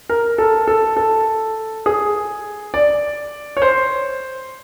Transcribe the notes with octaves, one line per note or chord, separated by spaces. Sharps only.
A#4
A4
A4
A4
G#4
D5
C#5
C5